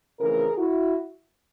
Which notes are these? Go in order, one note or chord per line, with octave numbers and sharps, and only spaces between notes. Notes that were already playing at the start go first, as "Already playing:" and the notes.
F2 C#3 E3 A3 C4 G#4 A#4
E4 F#4